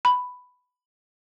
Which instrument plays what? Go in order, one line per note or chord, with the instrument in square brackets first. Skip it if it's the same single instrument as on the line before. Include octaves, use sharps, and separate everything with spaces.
[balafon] B5